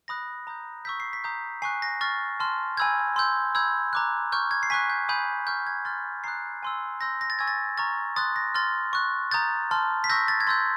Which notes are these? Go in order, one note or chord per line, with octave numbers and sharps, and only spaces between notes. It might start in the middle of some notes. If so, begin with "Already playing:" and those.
B5 D#6 F#6 A#6
A#5 D#6 G6
C#6 E6 G6 B6
C7
B6
A#5 D#6 G6
G#5 C#6 F#6 C7
A#6
C#6 F6 A6
A5 C6 F6
G#5 B5 E6 G6 G#6
C6 E6 G6
B5 E6 G6 G#6
A#5 D6 F#6
C#6 F6 G6
G#6
C7
G#5 C#6 F#6 B6
G6
G#5 B5 D#6 G6
C#6 F6 G6
G#6
C6 F6 A6
A#5 D#6 F#6 C7
G#5 C6 E6
C6 E6 G6 A#6
A#6
A6
G#5 C#6 E6 G#6
A6
A#5 C#6 F6 A6
C6 D#6 F#6 A6
A#6
C6 F6 A6
C#6 F#6
A#5 D#6 G6 A6
A5 C6 F6
B6
C#6 E6 G6 A#6
A6
G#6
C6 E6 G6 A6